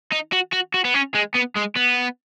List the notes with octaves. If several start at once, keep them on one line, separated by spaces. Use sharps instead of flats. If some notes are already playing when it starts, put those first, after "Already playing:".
D#4
F#4
F#4
F#4
B3
C#4
G#3
B3
G#3
B3